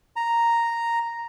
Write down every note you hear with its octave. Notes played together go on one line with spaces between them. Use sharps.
A#5